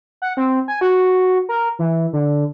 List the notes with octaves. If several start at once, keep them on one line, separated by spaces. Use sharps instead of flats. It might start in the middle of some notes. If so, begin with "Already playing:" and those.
F#5
C4
G#5
F#4
A#4
E3
D3